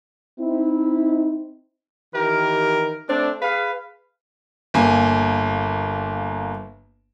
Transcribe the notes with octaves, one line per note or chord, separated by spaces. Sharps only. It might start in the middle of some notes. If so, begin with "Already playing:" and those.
C4 D#4 E4
D#3 E3 G4 A#4
A3 C4 D4
G#4 B4 F5
G1 A#3 G#5